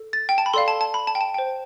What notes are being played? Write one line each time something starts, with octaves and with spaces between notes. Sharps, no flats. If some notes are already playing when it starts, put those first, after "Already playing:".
Already playing: A4
A6
G5
A5
B5
A4 D5 F5 C6
A5
A5
B5
A5
G5
A5
C5 G5